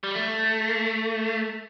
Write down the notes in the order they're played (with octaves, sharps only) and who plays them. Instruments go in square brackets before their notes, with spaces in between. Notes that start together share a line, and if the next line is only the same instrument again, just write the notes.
[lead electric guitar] G3
A3